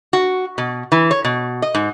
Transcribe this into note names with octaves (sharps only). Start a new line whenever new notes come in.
F#4
B2
E3
C#5
B2
D#5
G#2